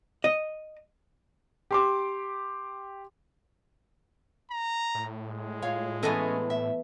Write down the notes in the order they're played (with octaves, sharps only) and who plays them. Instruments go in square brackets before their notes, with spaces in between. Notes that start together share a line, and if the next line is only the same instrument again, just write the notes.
[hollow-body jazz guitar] D#5
[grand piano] G4 C6 D6
[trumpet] A#5
[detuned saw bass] A2
[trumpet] G#3
[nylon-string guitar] F4 C#5 F5
[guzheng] E3 A3 B3 [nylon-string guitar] C#4 A4 D#5
[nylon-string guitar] E5